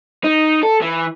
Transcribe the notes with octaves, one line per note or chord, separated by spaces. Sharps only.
D#4
A4
E3